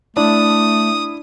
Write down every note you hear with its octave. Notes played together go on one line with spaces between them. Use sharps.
A3 D4 E4 D5 D#6